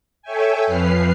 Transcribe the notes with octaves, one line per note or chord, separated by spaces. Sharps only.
A4 C#5 E5 G5 G#5
F2 F3 B4 F6 C7